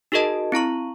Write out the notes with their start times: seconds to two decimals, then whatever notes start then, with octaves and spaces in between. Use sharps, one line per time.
0.12 D#4 F#4 G#4 A#4 D#5 A5
0.52 C4 E4 A#5 C#6